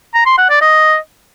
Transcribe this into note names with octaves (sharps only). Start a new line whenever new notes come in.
A#5
C6
F#5
D5
D#5